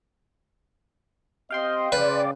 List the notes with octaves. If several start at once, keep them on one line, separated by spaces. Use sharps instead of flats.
C4 G4 D#5 F5 G5 C6
C#3 B4 D5